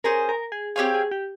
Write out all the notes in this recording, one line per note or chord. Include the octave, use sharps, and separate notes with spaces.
C#4 G#4 A#4 C5
A#4
G#4
C4 G4 G#4 C#5 F5
G#4
G4